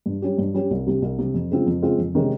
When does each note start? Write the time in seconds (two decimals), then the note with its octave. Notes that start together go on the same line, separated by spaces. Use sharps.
0.06 G2
0.22 G3 C#4 G4
0.38 G2
0.54 G3 C#4 G4
0.71 C2
0.86 C3 G3
1.02 C2
1.19 C3 G3
1.34 F2
1.51 C#3 G#3 C4 F4
1.66 F2
1.82 C#3 G#3 C4 F4
1.98 F2
2.15 C3 D#3 G#3 C#4